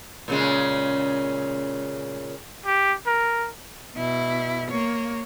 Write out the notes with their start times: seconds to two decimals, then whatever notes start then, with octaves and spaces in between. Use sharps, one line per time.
0.28 A#2 C#3 G#3
2.66 G4
3.07 A#4
3.96 B2 E4
4.71 A#3 C#5